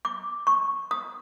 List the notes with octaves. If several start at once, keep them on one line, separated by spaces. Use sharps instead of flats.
D6
C#6
D#6